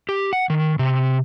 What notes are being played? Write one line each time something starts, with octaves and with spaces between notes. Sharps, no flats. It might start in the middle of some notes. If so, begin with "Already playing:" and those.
G4
F#5
D#3
C3